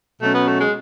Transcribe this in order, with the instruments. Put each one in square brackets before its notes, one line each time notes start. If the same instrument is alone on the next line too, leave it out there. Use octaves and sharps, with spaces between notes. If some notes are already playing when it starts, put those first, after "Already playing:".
[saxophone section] B2 F#3 C#4 [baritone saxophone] A3
[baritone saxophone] B3
A3
G#3